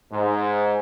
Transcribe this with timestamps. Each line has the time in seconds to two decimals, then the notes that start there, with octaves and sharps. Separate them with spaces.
0.12 G#2